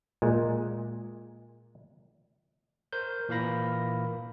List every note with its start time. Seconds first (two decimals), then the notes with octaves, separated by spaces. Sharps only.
0.22 A#2 G#3
2.92 A#4 C5 G6
3.29 A#2 E3 A#4 F5 B5 A#6